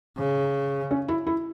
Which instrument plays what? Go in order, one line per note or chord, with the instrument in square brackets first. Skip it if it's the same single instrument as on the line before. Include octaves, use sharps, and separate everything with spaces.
[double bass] C#3
[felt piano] C#4
E4
E4